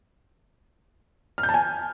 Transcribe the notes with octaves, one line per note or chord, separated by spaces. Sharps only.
F6
G6
A5
G#5